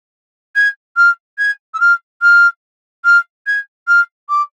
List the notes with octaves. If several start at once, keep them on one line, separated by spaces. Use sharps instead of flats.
G#6
F6
G#6
E6
F6
F6
F6
G#6
F6
D6